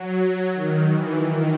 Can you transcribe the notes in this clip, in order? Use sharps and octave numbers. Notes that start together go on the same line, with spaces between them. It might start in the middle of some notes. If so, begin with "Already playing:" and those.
Already playing: F#3
D#3
E3
D#3